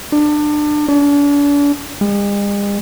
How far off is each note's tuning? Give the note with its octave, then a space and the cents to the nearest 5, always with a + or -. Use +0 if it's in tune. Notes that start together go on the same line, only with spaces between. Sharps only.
D4 +25
D4 -40
G#3 -45